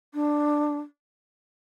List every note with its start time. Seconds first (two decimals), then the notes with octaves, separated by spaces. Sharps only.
0.14 D4